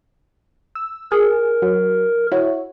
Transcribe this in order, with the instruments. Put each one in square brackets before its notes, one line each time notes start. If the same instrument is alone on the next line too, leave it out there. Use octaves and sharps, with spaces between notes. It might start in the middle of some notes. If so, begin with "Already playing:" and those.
[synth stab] E6
[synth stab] G#4 [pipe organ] A#4
[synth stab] F#3
E4 F#4 C#5